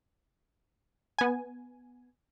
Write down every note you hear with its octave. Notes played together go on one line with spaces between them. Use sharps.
B3 G#5